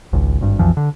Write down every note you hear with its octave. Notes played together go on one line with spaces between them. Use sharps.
G#1 C#2
G#1 G2
B1 F2 E3 F3
D3